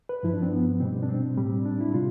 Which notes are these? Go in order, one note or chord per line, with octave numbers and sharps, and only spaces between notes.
B4
G2 F3 E4
D4
C4
B3
B2 G3 C4
D4
C4
A2 G3
D4
E4
C3 G3 F4